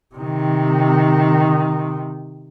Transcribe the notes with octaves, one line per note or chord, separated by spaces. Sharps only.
C3 D#3